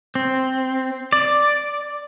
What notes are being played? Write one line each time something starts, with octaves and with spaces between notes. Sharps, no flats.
C4
D5